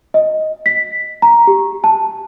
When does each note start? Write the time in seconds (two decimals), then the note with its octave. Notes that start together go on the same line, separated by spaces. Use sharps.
0.14 D#5
0.66 B6
1.22 A#5
1.47 G4
1.84 A5